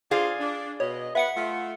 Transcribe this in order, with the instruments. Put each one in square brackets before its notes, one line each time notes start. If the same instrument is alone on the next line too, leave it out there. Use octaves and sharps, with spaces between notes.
[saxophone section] D4 F4 C5 [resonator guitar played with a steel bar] G#4 D5 F5
[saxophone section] D4
[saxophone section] B2 D#5 [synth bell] C#5
[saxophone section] B3 B4 [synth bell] E5 F#5 C#7
[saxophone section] A3 F4